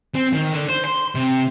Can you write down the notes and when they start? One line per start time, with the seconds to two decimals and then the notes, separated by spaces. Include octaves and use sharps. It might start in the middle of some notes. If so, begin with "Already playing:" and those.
0.15 C4
0.33 D#3
0.53 D3
0.69 C5
0.85 C6
1.15 C3